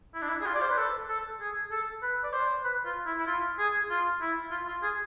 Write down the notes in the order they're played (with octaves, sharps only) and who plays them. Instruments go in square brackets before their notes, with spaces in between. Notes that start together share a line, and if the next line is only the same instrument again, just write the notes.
[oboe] E4
D4
E4
G#4
F4
D5
C5
B4
A4
A4
G#4
A4
B4
D5
C5
B4
F4
E4
E4
F4
G#4
F4
E4
F4
F4
G#4